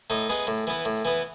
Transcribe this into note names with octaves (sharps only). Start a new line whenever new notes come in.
A2 D#4
G#3 B3
A2
E3 B3
A2
E3 B3